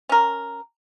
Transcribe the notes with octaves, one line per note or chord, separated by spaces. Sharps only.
C#4 A#4